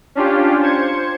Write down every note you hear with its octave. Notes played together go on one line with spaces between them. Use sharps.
C#4 D4 F4 G4
C5 G#6 C#7